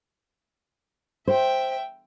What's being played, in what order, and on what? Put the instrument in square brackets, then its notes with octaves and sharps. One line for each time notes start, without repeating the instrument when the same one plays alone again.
[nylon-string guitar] C5 [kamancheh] E5 G5